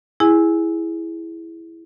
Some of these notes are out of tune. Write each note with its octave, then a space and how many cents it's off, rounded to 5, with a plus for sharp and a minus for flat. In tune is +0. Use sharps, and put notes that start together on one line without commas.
E4 +0 G#4 +0 G#5 +0